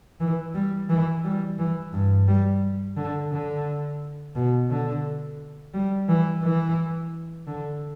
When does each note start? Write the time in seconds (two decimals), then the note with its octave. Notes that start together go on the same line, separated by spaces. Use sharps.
0.20 E3
0.54 G3
0.89 E3
1.24 G3
1.59 E3
1.93 G2
2.28 G3
2.97 D3
3.32 D3
4.35 B2
4.70 D3
5.74 G3
6.09 E3
6.43 E3
7.47 D3